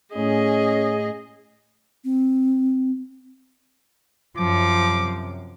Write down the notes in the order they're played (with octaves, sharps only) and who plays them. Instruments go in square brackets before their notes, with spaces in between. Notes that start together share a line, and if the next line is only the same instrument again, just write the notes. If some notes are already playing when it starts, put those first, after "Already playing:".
[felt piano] A2 [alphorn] C#4 [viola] G#4 D#5
[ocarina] C4
[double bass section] F#2 C3 [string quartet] F3 [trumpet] D6